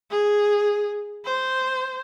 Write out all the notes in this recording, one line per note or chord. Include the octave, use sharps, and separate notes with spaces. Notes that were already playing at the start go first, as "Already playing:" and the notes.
G#4
C5